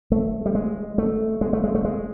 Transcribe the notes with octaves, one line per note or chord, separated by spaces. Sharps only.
A3
G3
G#3
A3
G#3
A3
G#3
A3
G#3